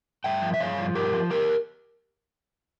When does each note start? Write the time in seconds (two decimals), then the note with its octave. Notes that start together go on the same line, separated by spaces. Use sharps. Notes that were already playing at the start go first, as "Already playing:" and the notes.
0.24 G2 E5 G5
0.42 F3
0.54 E5
0.60 G2 C#5 F5
0.78 F3
0.95 G2 G4 A#4
1.12 F3
1.30 G4 A#4